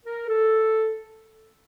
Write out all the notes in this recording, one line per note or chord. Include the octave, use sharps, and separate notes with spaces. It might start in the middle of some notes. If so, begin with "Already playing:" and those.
A#4
A4